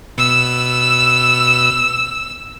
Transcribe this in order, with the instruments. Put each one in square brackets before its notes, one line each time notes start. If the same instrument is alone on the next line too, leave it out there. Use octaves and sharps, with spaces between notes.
[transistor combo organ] B2 [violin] E6